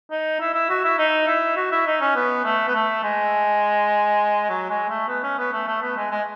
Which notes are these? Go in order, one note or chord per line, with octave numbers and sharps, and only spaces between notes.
D#4
E4
E4
F#4
E4
D#4
E4
F#4
E4
D#4
C#4
B3
A3
B3
A3
G#3
F#3
G#3
A3
B3
C#4
B3
A3
A3
B3
G#3
G#3